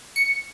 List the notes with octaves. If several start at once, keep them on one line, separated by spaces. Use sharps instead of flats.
C#7